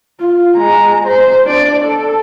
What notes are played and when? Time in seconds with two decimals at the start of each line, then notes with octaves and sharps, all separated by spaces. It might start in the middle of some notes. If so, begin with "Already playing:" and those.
0.20 F4
0.57 G#3 A#5
1.07 C5
1.46 D4 D5
1.84 A4